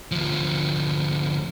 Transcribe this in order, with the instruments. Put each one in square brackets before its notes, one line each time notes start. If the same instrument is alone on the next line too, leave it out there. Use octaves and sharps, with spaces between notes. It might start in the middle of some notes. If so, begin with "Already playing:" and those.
[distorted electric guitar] D2 F3